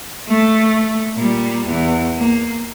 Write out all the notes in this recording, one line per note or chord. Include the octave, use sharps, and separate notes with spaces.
A3
A#2 G3
E2
A#3